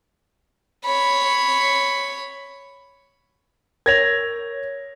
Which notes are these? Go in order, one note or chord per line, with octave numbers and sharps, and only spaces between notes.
C#5 B5
A#4 C#5 G#6 A#6 F7